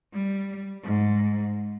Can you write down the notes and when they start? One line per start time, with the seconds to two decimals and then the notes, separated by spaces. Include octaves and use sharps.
0.13 G3
0.83 G#2